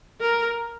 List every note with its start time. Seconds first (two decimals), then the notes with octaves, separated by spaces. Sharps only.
0.21 A#4